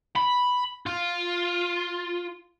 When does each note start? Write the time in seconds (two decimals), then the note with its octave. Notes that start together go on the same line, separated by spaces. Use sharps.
0.16 B5
0.86 F4